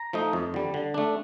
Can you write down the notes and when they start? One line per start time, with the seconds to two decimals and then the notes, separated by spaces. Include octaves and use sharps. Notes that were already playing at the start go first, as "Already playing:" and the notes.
Already playing: A#5
0.13 F3 A3 D#4
0.33 F2
0.54 D3 G3
0.74 D3
0.94 A3 D4